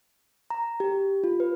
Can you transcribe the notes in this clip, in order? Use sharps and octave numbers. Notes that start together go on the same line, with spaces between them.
A#5
G4
F4
B4